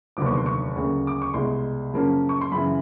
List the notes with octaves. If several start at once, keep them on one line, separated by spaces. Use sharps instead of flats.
F1 D#2 D3 F#3 B3 D6
C#6
C6
C#6
D2 C#3 F#3 A#3
D6
C#6
C2 B2 G#3 C6
F#2 C#3 F3 A#3 C#4
C#6
C6
F#2 C#3 E3 B5